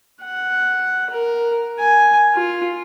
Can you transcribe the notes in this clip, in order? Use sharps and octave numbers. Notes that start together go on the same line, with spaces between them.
F#5
A#4
G#5
F4